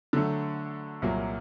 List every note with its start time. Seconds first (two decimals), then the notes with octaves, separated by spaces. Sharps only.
0.13 D3 F#3 A3
1.02 C2 A#2 F#3 A#3